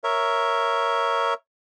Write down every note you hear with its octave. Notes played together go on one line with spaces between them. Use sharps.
A#4 C#5 E5